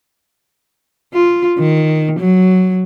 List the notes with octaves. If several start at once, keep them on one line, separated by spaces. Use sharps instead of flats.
F4
D#3
F#3